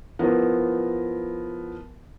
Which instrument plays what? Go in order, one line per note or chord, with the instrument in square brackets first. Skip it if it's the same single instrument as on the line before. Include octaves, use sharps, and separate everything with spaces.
[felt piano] F3 B3 E4 A#4